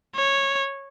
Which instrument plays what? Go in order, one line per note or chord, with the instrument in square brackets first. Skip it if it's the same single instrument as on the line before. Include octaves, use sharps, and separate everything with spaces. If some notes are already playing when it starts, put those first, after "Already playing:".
[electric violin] C#5